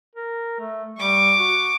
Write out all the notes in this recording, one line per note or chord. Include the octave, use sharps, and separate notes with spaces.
A#4
A3
G3 C#6 D6
F#4